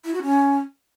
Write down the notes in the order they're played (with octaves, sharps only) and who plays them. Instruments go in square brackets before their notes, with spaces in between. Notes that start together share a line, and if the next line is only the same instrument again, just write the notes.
[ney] E4
F#4
C#4